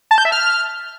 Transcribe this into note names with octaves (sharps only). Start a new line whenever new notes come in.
A5
G6
E5
F6